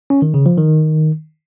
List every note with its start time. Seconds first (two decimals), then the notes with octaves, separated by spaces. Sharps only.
0.10 C#4
0.22 D#3
0.34 C#3
0.46 F3
0.58 D#3